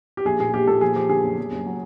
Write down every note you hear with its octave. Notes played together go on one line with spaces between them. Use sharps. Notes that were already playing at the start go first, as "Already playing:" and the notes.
G4
A#1 G#4
A#2 G#4
A#1 G4
A#2 A4
F3 G#4
F3 G4
D3 G#4
F#1
F#1
F#1
F#3